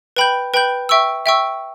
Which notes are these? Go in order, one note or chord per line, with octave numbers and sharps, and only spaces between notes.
B4 G5 B5 G6
B4 G5 B5 G6
E5 G5 C#6 E6
E5 G5 C#6 E6